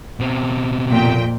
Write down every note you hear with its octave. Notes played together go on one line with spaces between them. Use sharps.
B2 C4
F2 A#2 G5